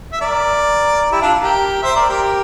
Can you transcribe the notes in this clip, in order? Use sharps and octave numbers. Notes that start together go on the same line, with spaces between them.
E5
A#4 D5
E4 G4
D4 F4
G4 A#4
C5 E5
A#4 D5
G4 A#4